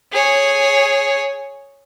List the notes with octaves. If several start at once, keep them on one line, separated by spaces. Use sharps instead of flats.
G#4 C#5